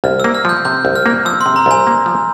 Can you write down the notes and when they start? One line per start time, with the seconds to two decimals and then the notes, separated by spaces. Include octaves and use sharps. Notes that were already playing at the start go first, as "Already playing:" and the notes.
0.04 C2 F6
0.20 A#3 E6
0.34 F6
0.45 F3 G6
0.65 C3 G6
0.85 C2
0.95 F6
1.06 A#3
1.25 F3 E6
1.41 C6
1.46 C3
1.56 A#5
1.66 C2 G#5
1.87 A#3
2.06 F3